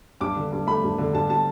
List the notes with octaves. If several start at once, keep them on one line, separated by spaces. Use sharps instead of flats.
G2 D6
D3
G2
A3 B5
G2
D3
G2 A5
G3 A5